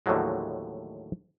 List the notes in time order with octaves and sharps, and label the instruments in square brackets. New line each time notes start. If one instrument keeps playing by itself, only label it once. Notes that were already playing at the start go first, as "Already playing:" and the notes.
[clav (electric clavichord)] D#2 A2 D3 F3 F#3 G#3